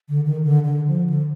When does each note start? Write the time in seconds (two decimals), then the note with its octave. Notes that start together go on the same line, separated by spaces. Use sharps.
0.09 D3
0.26 D#3
0.43 D3
0.65 D3
0.87 F3
1.10 D3